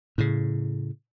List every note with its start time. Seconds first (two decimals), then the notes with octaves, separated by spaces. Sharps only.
0.18 A2 C#3